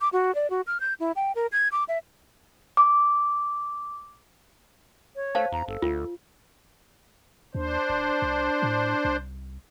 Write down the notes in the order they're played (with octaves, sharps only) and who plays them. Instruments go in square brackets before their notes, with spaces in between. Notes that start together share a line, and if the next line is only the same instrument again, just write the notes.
[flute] D6
F#4
D5
F#4
F6
G6
E4
G5
A#4
G#6
D6
E5
[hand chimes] D6
[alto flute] C#5
[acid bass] A3 [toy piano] C5 F5 A5
[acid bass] E2 [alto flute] A#5
[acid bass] G1 [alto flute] A4
[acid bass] D2 [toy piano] F4
[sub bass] D#2 [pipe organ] D4 C5
[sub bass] D1
C2
A2
C2